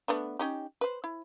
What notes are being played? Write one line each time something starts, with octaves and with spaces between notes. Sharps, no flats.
A3 B3 D4
C#4 D#4 G4
B4 C5
E4